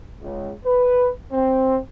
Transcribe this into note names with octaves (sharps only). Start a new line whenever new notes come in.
C#2
B4
C4